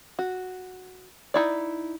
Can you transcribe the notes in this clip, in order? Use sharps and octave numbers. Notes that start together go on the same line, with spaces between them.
F#4
D#4 E4 D5